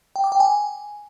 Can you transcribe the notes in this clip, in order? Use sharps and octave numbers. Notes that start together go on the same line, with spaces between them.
G5
D6
G5
G#5